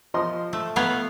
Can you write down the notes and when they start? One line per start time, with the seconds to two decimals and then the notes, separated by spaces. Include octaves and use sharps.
0.14 F3 D#5 C6
0.53 A3
0.76 B3 C#5 F5